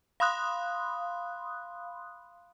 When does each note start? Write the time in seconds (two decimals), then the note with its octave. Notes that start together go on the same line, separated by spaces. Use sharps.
0.20 F5 B5 C6 D#6 F#6